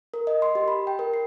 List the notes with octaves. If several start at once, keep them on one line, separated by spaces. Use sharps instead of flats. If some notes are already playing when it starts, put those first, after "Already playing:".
A#4
D#5
C6
G4
B5
G5
A#4
C7